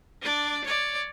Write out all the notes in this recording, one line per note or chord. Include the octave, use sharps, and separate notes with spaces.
D4 D5
C#5 D5